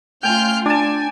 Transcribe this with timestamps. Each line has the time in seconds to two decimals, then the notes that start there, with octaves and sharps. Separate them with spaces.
0.23 A3 C#4 F4 G5 G#5 F6 G6
0.66 D4 D5 G#5 A5